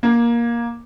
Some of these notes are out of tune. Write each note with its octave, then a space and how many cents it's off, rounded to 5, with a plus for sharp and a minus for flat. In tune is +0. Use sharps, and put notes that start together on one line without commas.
A#3 +15